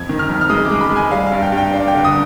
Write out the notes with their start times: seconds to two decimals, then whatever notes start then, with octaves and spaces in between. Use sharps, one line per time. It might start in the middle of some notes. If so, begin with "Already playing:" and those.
Already playing: F2 G#6
0.09 D#3
0.19 F6
0.29 F2
0.41 F6
0.49 G#3 D#6
0.65 D6
0.71 G#3
0.81 B5
0.91 G#3
0.96 G#5
1.11 G3 F5
1.27 F5
1.32 G2
1.42 G5
1.52 G2
1.58 G5
1.73 D4 F5
1.88 G5
1.94 D3
2.04 D#6